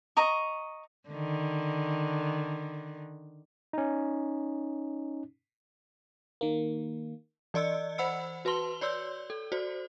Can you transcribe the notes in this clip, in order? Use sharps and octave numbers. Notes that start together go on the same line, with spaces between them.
D#5 A#5 C#6
D3 D#3
C#4 D#4
D#3 A#3
E3 D5 D#5 E6 C#7
C5 F#5 B5 E6 C#7
F#4 B4 A5 C6 G7
C#5 D5 C6 E6 G6
A4
F#4 C5 D5